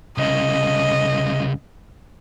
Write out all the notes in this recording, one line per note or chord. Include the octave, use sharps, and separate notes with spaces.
C2 C#3 D#5